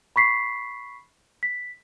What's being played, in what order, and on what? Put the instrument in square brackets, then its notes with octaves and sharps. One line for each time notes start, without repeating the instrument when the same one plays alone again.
[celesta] B5 C#6 B6 C7
B6